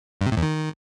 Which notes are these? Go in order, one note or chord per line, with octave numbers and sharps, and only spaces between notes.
G2
C3
A2
E2
D#3